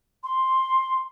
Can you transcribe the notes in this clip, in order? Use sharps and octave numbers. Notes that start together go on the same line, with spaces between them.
C6